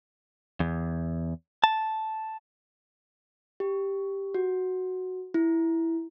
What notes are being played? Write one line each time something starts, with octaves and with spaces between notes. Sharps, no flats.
E2
A5
G4
F#4
E4